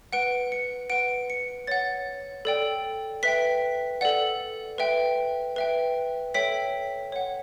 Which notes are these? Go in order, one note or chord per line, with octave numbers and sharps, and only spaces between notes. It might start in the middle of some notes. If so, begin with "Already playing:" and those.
B4 F#5 D7
C#7
B4 F#5 D7
C#7
C#5 F#5 A6
A4 D5 G5
B4 E5 G5 B6
A4 D5 F#5
B4 E5 G5
B4 E5 G5
A4 C#5 E5 G5 B6
C#5 F#5